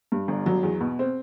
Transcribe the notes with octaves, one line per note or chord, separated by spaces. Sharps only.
G2
G1
F#3
E2
B2
C4